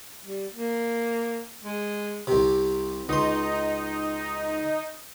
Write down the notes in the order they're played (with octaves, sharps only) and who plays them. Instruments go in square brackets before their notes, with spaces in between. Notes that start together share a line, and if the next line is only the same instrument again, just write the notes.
[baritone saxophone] G3
A#3
G#3
[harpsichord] C2 C3
[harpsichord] C#2 C6 [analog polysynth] D#4